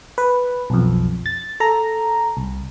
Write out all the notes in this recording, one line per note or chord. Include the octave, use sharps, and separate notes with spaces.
B4
B1 F2
A6
A4 A#5
C2